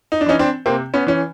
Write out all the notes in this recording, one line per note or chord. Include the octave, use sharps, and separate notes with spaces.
D#4
D4
E3 C#4 D#4
C4 D4
C3 A#3 C4
B3 C#4
E3 C#4